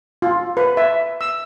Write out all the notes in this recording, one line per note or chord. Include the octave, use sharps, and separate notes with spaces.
F4
B4
E5
E6